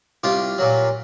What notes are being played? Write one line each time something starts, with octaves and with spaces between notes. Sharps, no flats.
C2 F4 G4
A#2 F#3